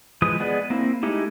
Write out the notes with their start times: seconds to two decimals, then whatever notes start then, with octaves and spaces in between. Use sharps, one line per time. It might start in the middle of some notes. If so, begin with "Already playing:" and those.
0.22 E3 F3 G#3 B4 D#6
0.40 G#3 B3 G#4 B4 D5
0.70 A#3 C4 E4
1.03 G#3 A3 D#4 E4 G4